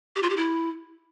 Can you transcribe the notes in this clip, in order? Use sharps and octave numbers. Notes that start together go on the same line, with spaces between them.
G4
F4
G4
E4